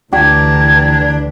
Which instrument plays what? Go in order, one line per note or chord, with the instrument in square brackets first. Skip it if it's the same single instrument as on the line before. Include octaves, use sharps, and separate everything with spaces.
[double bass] D2 E3 [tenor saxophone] D4 [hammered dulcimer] G4 [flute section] A5 A#5 G#6